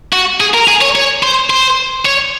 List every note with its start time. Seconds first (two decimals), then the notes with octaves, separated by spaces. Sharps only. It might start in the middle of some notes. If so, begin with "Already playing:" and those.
0.13 F#4
0.40 G#4
0.54 A#4
0.68 G#4
0.81 C#5
0.96 C#5
1.23 C5
1.50 C5
2.05 C#5